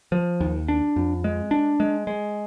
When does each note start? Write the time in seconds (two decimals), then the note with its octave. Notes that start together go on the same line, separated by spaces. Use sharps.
0.12 F3
0.40 D#2
0.68 D4
0.96 F2
1.24 G#3
1.51 D4
1.80 G#3
2.07 G#3